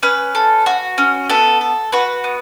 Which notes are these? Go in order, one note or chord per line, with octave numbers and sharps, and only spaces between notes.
C#4 B4
A4
F#4
C#4
B3 A4
A4
F#4 B4
B3